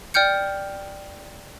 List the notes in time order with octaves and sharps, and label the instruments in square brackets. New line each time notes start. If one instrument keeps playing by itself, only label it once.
[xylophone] D5 G5 F6 G6 C#7